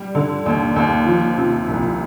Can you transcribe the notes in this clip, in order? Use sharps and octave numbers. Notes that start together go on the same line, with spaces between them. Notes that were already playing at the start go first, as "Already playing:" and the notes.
Already playing: G3
D3
D#2
D#2
F3
C3
C2